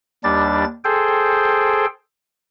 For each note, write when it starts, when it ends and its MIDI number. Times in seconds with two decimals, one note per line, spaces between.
0.24 0.65 39
0.24 0.65 55
0.24 0.65 62
0.24 0.65 93
0.84 1.86 68
0.84 1.86 69
0.84 1.86 72
0.84 1.86 79